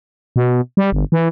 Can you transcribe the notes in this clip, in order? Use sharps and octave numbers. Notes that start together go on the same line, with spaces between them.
B2
G3
G1
E3